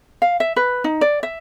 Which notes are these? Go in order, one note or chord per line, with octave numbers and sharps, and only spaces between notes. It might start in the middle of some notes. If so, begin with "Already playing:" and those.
F5
E5
B4
D#4
D5
E5